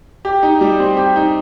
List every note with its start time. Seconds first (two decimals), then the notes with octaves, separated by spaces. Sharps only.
0.25 G4
0.43 D#4
0.61 G3
0.79 C4
0.97 G4
1.16 D#4